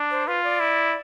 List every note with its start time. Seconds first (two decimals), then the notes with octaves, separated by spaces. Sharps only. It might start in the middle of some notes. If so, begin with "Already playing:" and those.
Already playing: D4
0.11 C5
0.27 F4 B4
0.44 D5
0.60 E4